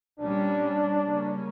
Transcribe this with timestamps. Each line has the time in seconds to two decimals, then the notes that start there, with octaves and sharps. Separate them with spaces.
0.20 A#2 G3 C#4 D4
1.03 C#3 G3 A#3 C#4